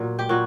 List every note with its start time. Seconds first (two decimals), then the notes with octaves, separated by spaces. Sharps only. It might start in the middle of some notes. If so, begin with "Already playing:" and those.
Already playing: A#2 F#3
0.19 G4
0.29 A#2 F#3 F#4